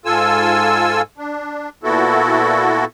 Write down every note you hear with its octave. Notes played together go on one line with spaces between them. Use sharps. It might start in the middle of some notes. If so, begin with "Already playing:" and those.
G#2 F4 A4 G#5 E6
D4
A#2 B3 E4 F#4 A4